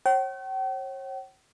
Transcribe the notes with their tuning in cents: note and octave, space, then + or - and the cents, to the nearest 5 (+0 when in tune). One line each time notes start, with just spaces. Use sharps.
C#5 -40 G5 -45